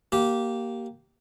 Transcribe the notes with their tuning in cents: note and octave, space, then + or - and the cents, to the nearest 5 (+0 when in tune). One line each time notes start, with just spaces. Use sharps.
A#3 +0 G4 -15